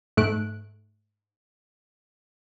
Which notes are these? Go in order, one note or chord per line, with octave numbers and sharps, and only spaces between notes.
G#2 A3 A4 F#6 D7